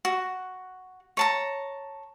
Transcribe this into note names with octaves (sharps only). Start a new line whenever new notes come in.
F#4
C#5 A5 A#5